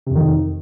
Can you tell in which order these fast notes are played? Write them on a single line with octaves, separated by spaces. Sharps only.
C3 F2 D#3